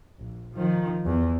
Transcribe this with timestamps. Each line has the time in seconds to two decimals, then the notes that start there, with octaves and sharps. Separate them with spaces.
0.18 A#1
0.54 D#3 F3
1.06 E2